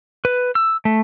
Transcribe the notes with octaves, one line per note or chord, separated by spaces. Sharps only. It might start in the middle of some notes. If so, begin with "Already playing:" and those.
B4
E6
A3